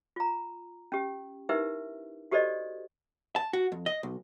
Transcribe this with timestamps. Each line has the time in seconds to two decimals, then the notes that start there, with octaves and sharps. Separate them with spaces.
0.16 F4 A#5
0.92 C#4 G4
1.49 D#4 E4 G4 A#4 B4 E5
2.31 F#4 G4 A4 C5 D5 D#5
3.36 A5
3.53 F#4
3.72 F2
3.86 D#5
4.03 B1